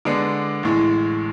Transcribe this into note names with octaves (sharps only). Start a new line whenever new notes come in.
D3 G#3 B3 D4
A1 A2 G#3